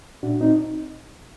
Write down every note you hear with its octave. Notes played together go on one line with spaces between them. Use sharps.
A#2 D4 F#4
C4 D#4